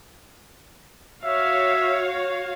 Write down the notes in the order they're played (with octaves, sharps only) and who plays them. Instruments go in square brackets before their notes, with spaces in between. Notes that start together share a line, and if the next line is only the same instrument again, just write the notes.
[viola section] F#4 C#5 F5 [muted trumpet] E5